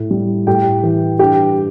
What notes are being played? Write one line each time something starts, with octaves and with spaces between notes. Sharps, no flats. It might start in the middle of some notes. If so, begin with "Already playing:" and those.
Already playing: A2
G3
A2 G4 G5
E3
G2 G4 G5